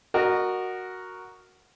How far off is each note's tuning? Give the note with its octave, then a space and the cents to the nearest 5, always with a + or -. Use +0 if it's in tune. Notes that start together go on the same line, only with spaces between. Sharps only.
F#4 +0 A#4 +0 D#5 -30